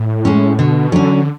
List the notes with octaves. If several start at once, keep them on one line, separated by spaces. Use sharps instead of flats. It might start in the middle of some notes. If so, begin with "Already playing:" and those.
Already playing: A2
G#3 C#4
B2 D3
D3 F#3 C#4